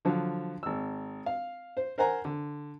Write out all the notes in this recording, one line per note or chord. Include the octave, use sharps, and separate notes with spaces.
D3 F3 F#3
G#1 E6
F5
C5
A#4 C5 F#5 G#5 A#5
D3